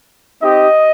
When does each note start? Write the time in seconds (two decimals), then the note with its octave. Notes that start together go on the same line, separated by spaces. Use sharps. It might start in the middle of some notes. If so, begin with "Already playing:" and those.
0.42 C4 D#4 G4 D#5